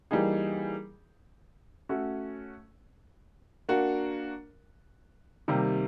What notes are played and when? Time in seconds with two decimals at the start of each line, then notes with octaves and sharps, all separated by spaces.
0.11 E3 G3 A#3 D#4 G#4
1.89 A3 C#4 F#4
3.69 A#3 D4 F#4 A#4
5.48 C3 D#3 G3 A#3